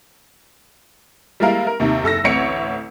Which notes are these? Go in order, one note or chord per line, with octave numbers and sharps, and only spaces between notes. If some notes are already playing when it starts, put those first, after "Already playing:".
G3 G#3 A#3 E4 A#4 F5
A#4
D#2 C3 D#3
F#1 A4 E6 A#6
A1 D2 C4 C#5 C#7 D7